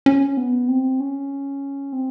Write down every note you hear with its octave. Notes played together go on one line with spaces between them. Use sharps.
C#4
B3
C4
C#4
C4